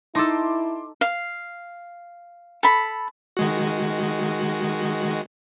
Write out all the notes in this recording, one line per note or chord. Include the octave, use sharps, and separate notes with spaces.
D#4 E4 A4 A5 C6 D6
F5
A4 B5
D#3 G#3 F#4